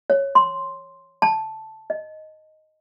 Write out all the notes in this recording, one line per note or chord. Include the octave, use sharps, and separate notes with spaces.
C#5
C6
A5
D#5